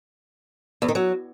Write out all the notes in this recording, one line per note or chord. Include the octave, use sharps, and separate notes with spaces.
E2
D#3
F#3